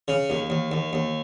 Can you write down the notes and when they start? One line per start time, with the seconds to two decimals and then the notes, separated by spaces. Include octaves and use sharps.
0.08 C#3
0.30 D#2
0.50 D#2
0.72 D#2
0.93 D#2